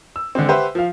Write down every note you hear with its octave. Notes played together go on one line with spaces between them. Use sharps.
E6
D3 G#3 C4
G4 B4 C5 E5 F#5
F3 F5